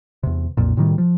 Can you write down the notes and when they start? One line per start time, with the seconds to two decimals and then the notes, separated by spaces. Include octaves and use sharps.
0.23 E2 C3
0.57 B1 F2 A#2
0.77 A2 C3 D#3 G3
0.98 F3